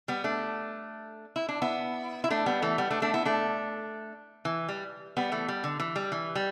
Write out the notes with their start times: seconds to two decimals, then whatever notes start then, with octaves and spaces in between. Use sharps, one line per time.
0.08 G3 B3
0.24 A3 D4
1.36 E4
1.49 D4
1.62 B3 E4
2.24 E4
2.30 A3 D4
2.46 G3 B3
2.62 E3 A3
2.78 G3 B3
2.91 A3 D4
3.02 A3 D4
3.14 B3 E4
3.25 A3 D4
4.45 E3
4.68 G3
5.17 G3 B3
5.32 E3 A3
5.48 G3
5.64 D3
5.80 E3
5.96 G3
6.12 E3
6.35 G3